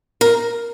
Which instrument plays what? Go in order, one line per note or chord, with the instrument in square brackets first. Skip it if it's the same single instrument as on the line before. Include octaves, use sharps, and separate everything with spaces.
[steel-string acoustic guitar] A#4